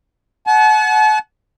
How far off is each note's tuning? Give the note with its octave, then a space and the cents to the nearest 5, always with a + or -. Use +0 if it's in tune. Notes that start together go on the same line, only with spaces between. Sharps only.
F#5 +0 A5 -40